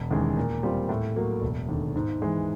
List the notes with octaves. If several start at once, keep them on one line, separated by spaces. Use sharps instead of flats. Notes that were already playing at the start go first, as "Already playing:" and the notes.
Already playing: E1
D#2 C#3 E3 G#3
A#2
G3 C4 F4
A2
F#3 A#3
E1
D#2 D3
G#2
E3 G#3